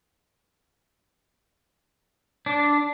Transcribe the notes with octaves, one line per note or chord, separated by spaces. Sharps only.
D4